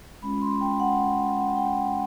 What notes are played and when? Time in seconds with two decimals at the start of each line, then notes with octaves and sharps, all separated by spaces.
0.22 G#3 C#4 F4 B5
0.42 C6
0.61 G5
0.80 F#5
1.18 F#5
1.37 F#5
1.56 G5
1.75 G5